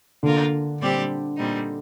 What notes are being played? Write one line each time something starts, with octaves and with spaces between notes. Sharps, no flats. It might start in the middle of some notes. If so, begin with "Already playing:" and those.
D3 A#3 F4 A#4
A#2 G3 C4 G4 D5
A#2 G3 C4 D#4